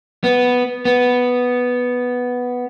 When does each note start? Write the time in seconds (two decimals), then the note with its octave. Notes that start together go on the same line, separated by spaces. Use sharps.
0.24 B3
0.85 B3